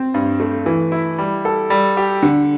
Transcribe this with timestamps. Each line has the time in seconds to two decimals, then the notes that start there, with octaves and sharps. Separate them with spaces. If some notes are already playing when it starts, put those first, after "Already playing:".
Already playing: C4
0.14 G2
0.40 A3
0.66 E3
0.92 E4
1.18 G3
1.45 A4
1.70 G3
1.97 G4
2.23 D3